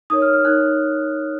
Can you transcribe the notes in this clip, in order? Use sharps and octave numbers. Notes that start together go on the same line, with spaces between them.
D#4 A#4 C#5 D#6
F6
F6
D#4 A#4 C#5 F#6